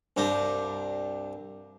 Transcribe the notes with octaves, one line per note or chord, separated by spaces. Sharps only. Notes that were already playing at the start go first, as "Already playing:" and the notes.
C2 G2 D4 G4 A#5